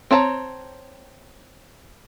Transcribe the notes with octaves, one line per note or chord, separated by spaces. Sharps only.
C4 C#5 A5 A#5